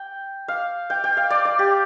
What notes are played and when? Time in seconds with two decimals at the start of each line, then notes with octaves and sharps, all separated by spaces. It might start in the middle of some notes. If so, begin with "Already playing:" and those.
Already playing: G5
0.48 F5
0.90 G5
1.04 G5
1.17 F5
1.30 D5
1.45 D5
1.59 G4